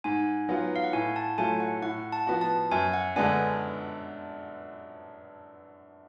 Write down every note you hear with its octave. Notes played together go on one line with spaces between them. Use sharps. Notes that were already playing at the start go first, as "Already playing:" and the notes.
G#2 G#5
F#3 B3 F4
F5
F#5
A2 G#5
A5
F#3 A3 F4 G#5
F#5
A2 F#5
A5
F3 B3 F#4
A5
F#2 G#5
F#5
D3 G#3 B3 D4 G#5